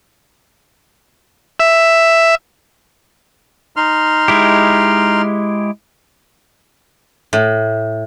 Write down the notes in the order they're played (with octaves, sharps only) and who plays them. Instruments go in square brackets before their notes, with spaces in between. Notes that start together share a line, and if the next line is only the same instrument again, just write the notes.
[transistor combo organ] E5
[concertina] D#4 C6 F6
[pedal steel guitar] G#3 E4 G4
[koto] A2